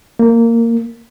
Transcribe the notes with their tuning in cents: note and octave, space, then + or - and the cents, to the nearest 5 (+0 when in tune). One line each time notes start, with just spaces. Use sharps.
A#3 -15